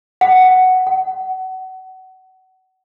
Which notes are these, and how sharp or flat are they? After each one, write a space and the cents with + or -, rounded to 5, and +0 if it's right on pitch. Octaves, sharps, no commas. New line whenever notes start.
F#5 +5
F#5 +25